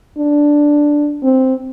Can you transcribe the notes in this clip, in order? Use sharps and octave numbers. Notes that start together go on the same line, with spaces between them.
D4
C4